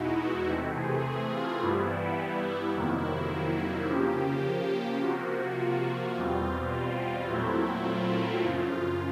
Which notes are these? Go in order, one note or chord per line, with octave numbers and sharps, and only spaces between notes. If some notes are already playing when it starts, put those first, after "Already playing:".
Already playing: E2 B2 G#3 D#4 E4 F#4
F#4
C3 E3 A3 C4
G#4
F4
G2 E3 G3 B3 E4
F2 C3 D#3 F#3 A#3 E4
E4
C#3 F3 A#3 G4
C3 F3 A#3 F#4
F#4
F4
E2 B2 G3 C4
F4
F4
A#2 F#3 A3 C4 E4
E4
F4
F#2 C#3 F3